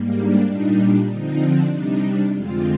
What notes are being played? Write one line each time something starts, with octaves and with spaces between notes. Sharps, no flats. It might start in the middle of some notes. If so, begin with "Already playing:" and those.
Already playing: G#2 G3 A#3
D4
A#2 G3 D4 D#4
D3 F3 C4 D#4
D4
C3 G3 D4 D#4
F2 D3 G#3 C4 F4